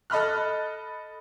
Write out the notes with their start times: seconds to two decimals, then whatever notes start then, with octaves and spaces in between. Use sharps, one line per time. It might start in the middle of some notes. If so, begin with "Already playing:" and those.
0.10 A4 D#5 B5 F6 F#6